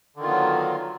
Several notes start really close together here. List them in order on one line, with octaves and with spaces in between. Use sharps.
D3 D#3 F4 B3 F#3